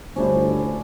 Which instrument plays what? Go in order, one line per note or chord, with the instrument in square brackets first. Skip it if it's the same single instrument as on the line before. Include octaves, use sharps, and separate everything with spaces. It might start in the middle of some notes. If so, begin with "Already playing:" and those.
[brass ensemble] G1 [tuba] D2 [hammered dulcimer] C#4 D4 E4 [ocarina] C5